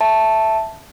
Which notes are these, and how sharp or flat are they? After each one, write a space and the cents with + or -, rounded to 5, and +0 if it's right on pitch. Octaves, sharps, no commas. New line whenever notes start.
E5 +0 A5 +0